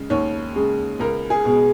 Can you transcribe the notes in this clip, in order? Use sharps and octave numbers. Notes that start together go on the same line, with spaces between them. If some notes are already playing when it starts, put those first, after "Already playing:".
Already playing: C#3 G#3
D#2 C#5
C#3 G#3
C#2 A#4
G#4
B2 G#3